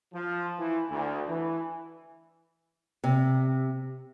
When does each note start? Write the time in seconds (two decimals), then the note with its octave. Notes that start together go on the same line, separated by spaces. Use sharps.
0.14 F3
0.59 E3
0.90 D2
1.29 E3
3.04 C3